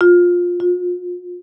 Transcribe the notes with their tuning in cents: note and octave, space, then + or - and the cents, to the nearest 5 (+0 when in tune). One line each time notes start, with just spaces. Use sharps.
F4 +15
F4 +40